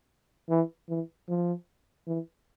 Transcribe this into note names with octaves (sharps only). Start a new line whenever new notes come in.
E3
E3
F3
E3